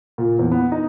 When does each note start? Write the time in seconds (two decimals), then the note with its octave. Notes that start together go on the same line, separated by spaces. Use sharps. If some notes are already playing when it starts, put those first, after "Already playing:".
0.18 A#2
0.39 E2
0.52 B3
0.72 D#4